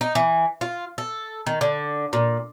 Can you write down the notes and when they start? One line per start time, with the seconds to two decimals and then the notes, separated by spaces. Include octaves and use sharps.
0.01 D#4
0.15 E3
0.61 F4
0.98 A4
1.47 D#3
1.61 D3
2.13 A#2